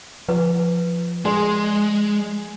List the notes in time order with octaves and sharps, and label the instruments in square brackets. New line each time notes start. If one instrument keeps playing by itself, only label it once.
[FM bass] F3 [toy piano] B4
[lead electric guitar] G#3 [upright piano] G#4 [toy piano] D5 G#5 C6